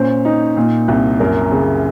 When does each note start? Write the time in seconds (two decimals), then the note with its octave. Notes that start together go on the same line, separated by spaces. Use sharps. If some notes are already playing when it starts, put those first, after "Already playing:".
Already playing: A#2 C#4 C5
0.25 D#4
0.57 A#2
0.88 C2
1.20 F#2 A#4
1.52 C#3